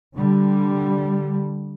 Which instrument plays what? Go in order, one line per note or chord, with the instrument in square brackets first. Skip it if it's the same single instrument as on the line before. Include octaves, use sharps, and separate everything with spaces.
[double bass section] D3 G3